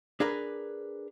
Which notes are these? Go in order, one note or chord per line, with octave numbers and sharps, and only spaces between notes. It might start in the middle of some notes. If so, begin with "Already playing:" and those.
D4 G#4 A#4 B4